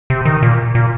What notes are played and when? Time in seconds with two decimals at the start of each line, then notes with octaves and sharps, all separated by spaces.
0.10 C3
0.25 D#3
0.42 A#2
0.75 A#2